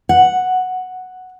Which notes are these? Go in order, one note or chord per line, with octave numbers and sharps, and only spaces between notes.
F#5